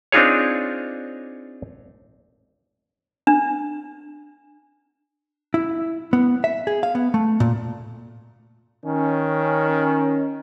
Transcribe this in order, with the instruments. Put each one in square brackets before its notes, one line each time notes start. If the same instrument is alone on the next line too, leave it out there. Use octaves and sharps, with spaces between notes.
[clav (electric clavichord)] C4 D4 D#4 F4 G#4 C#5
[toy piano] D4
[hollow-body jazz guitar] E4
B3
E5
G#4
F5
B3
A3
A#2
[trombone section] D#3 C#4